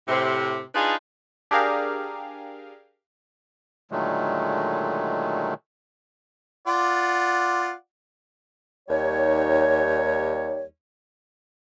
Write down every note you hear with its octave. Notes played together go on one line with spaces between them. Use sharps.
A2 C3
D4 D#4 F4 G#4 B4
D4 G4 G#4 A#4 F5
A#2 D3 D#3 F#3 G#3 A3
F4 D5 F#5
D#2 G3 D#4 C#5